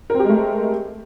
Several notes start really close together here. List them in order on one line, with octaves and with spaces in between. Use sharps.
A#4 C4 G4 G#3 A3